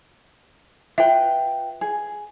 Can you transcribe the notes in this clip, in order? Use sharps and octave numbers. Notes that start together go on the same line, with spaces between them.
F4 B4 E5 G5
G#4